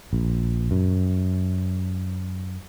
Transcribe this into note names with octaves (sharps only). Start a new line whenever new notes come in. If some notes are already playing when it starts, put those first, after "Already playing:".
A#1
F#2